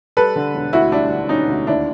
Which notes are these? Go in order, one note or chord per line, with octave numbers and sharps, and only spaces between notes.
G3 A4 B4
D3
E1
D2 E4 F#4
G3 D4 E4
D3
E1 C#4 D#4
D2
D#2 D4 E4